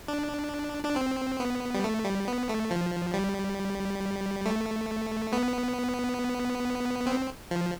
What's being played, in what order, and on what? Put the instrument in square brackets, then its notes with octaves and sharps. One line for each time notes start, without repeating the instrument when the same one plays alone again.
[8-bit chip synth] D4
D4
C4
B3
G3
A3
G3
B3
A3
F3
G3
A3
B3
C4
F3